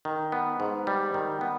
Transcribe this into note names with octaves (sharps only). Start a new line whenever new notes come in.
D#3
B3
G#2
G3
D#3
B3